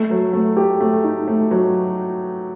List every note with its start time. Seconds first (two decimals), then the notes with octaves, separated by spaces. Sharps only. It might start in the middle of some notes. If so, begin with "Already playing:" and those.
Already playing: A3
0.10 F#3
0.33 A3
0.57 G4
0.81 A3
1.04 D#4
1.28 A3
1.51 F#3